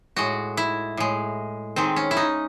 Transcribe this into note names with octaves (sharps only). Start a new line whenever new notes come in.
A2 G#3 F#4
E4
A2 G#3
D#3 G#3 C4
C#4
E4
D#4